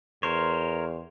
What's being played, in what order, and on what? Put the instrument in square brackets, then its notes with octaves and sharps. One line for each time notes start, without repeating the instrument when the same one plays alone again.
[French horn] E2 [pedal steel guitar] A#4 C5 C#5